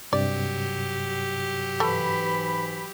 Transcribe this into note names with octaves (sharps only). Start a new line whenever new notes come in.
G2 C3 F#3 G4 D5
G#2 E3 A3 B5